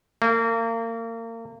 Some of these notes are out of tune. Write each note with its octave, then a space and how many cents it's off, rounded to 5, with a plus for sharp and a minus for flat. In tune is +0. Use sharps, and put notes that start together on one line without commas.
A#3 -35